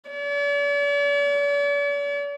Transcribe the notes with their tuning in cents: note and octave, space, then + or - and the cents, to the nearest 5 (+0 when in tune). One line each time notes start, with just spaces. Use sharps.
D5 -45